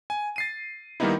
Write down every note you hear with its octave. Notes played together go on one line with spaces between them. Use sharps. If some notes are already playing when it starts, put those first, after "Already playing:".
G#5
A6 C7 D#7
D#3 G3 A#3 B3 D#4 E4